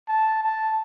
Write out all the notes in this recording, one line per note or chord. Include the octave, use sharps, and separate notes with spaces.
A5
A5